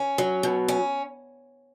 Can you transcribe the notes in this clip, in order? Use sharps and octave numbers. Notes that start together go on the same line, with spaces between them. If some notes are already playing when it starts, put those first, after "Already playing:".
Already playing: C#4
F#3
B2
C#4